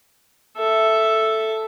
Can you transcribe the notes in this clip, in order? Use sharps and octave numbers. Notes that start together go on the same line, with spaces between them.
A4 E5